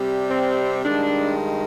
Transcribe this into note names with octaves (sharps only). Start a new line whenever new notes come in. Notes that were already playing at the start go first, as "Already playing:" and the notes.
Already playing: C3 G3
C4
G2 D#3 G#3 D4